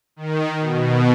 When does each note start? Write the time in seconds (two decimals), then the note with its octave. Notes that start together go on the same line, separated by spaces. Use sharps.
0.16 D#3
0.60 B2